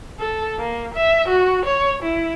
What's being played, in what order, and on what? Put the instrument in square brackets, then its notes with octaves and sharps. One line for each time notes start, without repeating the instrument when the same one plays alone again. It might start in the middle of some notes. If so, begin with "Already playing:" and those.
[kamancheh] A4
A#3
E5
F#4
C#5
E4